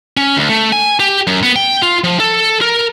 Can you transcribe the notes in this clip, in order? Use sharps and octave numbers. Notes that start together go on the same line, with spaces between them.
C#4
D2
A3
G#5
G4
F#2
B3
G5
F4
F3
A4
A#4